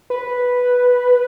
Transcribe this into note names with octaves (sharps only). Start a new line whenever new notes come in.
B4